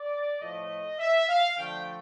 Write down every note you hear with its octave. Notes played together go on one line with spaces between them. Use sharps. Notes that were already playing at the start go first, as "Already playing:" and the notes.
Already playing: D5
A2 F3 A3 D#5
E5
F5
D3 F3 A3 G5